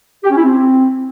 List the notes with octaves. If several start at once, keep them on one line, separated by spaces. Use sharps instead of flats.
G4
C#4
E4
C4